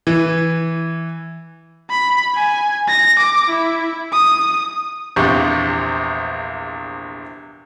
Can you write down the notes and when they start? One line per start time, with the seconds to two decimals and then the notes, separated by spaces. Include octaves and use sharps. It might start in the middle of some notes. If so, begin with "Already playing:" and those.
0.07 E3
1.90 B5
2.35 G#5
2.88 A#6
3.19 D6
3.50 E4
4.13 D#6
5.16 A#1 E2 C3 G4 C#6